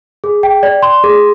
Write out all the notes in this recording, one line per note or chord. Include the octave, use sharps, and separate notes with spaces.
G#4
G5
D5
C6
G#4